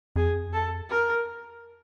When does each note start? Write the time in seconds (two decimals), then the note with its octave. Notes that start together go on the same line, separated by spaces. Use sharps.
0.16 F2 G#4
0.53 A4
0.89 A#4